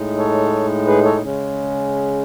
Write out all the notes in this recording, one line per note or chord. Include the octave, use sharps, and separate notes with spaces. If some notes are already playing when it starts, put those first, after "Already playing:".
Already playing: A2 G#3 D#4
A4 C#5
G#4 B4
A4 C#5
C#3 G#3 C#4